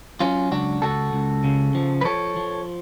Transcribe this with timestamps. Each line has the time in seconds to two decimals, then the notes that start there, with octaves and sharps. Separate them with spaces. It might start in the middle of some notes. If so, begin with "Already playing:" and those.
0.20 F#3 C#4 F4
0.51 C#2 D4 F#4
0.82 C#2 F#4 A4
1.13 C#2
1.44 C#3
1.75 F3
2.01 B4
2.04 F3 A4 C#5
2.37 F3